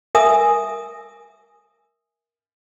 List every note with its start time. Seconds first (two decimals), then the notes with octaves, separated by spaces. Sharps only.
0.15 A#4 E5 G#5 D#6